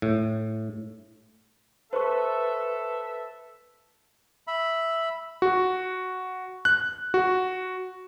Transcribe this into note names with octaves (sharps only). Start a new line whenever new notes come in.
A2
A4 B4 C5 E5 C#6
E5 B5
F#4
F#6
F#4